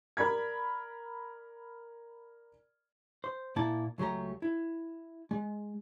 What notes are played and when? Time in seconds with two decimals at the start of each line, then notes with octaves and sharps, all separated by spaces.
0.17 A#4 D5 B5 G#6
3.24 C5
3.56 A#2 A#3 E4 A5
3.98 C#2 F#3 A3 G4 A#5
4.42 E4
5.31 G#3